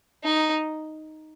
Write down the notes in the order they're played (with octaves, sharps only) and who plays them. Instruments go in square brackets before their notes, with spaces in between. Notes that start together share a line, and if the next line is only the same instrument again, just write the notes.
[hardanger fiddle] D#4